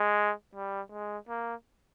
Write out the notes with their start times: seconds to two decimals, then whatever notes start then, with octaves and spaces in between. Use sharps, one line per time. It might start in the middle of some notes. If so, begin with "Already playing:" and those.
Already playing: G#3
0.55 G3
0.92 G#3
1.29 A#3